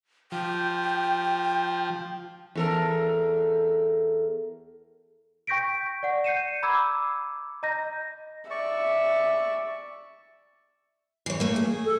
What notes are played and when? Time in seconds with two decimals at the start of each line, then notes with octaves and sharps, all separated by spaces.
0.32 F3 G5
2.55 E2 A4 A#4
5.47 G5 C#6 G6 A#6 B6 D7
6.03 D5 F#5
6.24 G6 C7 C#7 D#7 E7
6.63 A#5 B5 D6 E6 G#6
7.63 D#5 A#5 G6 A#6
8.50 D5 E5 C#6
11.26 E3 C#5
11.40 A3 A#3
11.56 G#4
11.85 A4